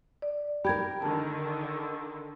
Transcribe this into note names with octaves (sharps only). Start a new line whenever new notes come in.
D5
G4 A#4 B5 G#6
D3 D#3 A5